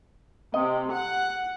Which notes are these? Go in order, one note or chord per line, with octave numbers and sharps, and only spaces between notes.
C3 D#5
F#5